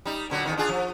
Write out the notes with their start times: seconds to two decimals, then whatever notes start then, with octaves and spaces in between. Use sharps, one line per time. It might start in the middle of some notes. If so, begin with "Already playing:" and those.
0.05 G3 D#4
0.30 A#2 D3 F#3
0.45 E2 A2 D#3
0.58 D4 F4 G#4
0.69 F3